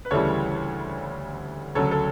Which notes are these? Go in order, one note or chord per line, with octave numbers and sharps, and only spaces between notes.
B4
D2 C#3 E3 G3 A4 C#5
D2 C#3 F#3 A4 C#5
A4